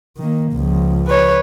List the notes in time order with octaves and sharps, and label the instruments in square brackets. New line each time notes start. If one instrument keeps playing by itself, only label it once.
[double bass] D#3 A#3
C#2 F3
[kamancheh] B4 C#5